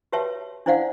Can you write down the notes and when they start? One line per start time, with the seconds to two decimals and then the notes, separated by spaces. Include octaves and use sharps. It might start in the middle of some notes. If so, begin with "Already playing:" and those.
0.12 F#4 G4 B4 C#5 E5 A5
0.66 D4 E4 C5 D5 F5 F#5